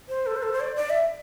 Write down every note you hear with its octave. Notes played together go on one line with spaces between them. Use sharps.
C5
A4
C5
A4
C5
D5
D5
E5